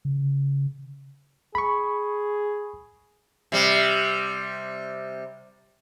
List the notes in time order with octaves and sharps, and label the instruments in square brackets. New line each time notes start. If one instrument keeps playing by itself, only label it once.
[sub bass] C#3
[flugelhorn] G#4 [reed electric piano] B5 C#6
[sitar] C3 G3